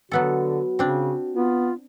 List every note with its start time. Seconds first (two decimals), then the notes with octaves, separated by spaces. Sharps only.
0.12 D3 F#3 B3 F#4 A4
0.79 C#3 C4 D4
1.34 B3 F4